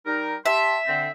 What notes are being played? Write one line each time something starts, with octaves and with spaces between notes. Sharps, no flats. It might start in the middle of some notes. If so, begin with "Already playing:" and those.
G3 D#4 A#4
G4 E5 A5 C6
D3 C4